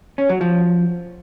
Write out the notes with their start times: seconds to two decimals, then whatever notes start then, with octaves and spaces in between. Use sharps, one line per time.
0.18 C#4
0.29 F#3
0.41 F3